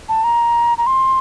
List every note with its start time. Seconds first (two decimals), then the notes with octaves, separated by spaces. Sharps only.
0.09 A5
0.24 A#5
0.78 A#5
0.87 C6